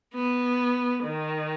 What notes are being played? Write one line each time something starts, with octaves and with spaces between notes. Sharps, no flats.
B3
D#3